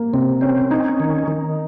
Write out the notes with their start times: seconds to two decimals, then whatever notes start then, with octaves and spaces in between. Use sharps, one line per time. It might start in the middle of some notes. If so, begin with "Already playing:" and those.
Already playing: A#3
0.13 C3 C4
0.41 C4 C#4
0.71 C#4 D#4
1.00 D#3
1.28 D#3